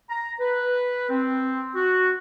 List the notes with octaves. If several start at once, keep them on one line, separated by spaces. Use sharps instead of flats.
A#5
B4
C4
F#4